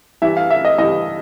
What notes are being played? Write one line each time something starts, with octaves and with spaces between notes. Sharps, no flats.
G2 E3 E5
F5
E5
D#5
G2 E3 D#5